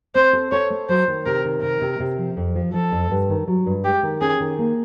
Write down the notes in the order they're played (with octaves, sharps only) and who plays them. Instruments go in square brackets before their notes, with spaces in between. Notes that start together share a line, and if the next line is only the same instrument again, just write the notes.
[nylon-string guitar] C4 [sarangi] C5
[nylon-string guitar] A4
[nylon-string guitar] A4 [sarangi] C#5
[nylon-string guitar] A3
[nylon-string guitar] F#3 [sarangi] C5
[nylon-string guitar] D#3
[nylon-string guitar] C3 [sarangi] A#4
[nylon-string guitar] D#3
[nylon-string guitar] C3 [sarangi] A#4
[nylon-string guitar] C3
C3
F3
F2
F3
[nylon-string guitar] F3 [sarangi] A4
[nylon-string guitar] F2
G2
D#3
F#3
G2
[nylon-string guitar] G#3 [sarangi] G4
[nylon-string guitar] D#3
[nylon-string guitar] C#4 [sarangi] G#4
[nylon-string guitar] D#3
A#3